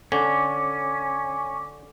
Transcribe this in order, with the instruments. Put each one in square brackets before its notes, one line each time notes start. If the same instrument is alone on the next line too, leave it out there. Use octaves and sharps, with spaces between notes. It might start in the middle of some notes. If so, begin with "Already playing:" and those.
[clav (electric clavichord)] D3 [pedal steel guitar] C#4 [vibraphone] D6